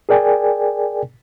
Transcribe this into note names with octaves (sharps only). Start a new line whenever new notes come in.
G#4 A#4 D5 G5 G#5